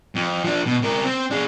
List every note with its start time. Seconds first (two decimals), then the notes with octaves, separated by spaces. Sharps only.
0.15 F2
0.44 F3 D4
0.66 B2
0.82 C3 A#4
1.04 C4
1.31 D4 G#4